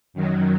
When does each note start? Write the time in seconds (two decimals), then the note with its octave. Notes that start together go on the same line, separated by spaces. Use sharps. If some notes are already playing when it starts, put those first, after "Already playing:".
0.14 F#2 D#3 F#3